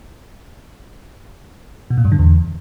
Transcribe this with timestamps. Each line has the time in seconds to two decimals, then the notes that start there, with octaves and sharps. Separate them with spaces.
1.90 B2
1.98 A#2
2.05 G2
2.12 D3
2.19 E2